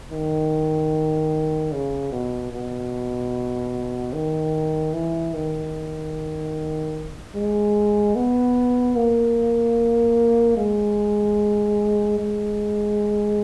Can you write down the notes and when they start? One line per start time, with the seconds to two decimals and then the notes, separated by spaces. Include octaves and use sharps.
0.11 D#3
1.72 C#3
2.12 B2
2.52 B2
4.13 D#3
4.93 E3
5.34 D#3
7.35 G#3
8.16 B3
8.96 A#3
10.57 G#3
12.18 G#3